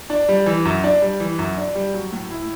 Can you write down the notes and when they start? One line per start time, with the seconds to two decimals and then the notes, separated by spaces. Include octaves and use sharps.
0.10 D4
0.29 G3
0.46 E3
0.65 F#2
0.84 D4
1.02 G3
1.20 E3
1.39 F#2
1.57 D4
1.75 G3
1.94 F#3
2.12 A2
2.31 E4